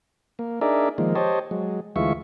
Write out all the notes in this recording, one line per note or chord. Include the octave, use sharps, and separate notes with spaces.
A#3
D4 D#4 G#4 A#4 D5 E5
D#3 F3 G#3 A#3
G4 C5 C#5 D#5 A5
F#3 G#3
D2 E3 G#3 F4 E5 C#6